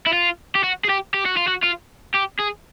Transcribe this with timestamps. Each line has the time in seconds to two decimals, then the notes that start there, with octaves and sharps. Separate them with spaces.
0.07 E4
0.13 F4
0.55 G4
0.63 F#4
0.85 G#4
0.89 G4
1.14 G4
1.26 F#4
1.37 F4
1.48 F#4
1.64 F4
2.14 G4
2.39 G#4